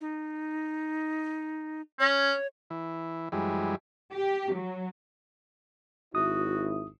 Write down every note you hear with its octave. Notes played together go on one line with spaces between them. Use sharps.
D#4
C#4 C#5
E3
F#2 E3 G3 G#3
G4
F#3
G#1 E4 F#4 D#6